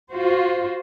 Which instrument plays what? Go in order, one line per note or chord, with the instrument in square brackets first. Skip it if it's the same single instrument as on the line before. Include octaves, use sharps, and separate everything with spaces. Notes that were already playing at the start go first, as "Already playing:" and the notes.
[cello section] F4 F#4 C5